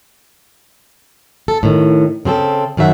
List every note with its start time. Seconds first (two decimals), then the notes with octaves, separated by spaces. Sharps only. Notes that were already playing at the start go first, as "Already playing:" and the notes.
1.48 A4
1.63 A2 D#3
2.25 C#3 C4 G#4 A4
2.77 F#2 D#3 F#3 E5 F#5